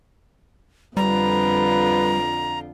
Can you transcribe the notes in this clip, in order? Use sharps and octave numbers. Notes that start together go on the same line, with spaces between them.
F2 D3 G3 F4 B4 A#5